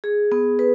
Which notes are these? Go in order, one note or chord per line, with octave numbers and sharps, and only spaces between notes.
G#4
B3
B4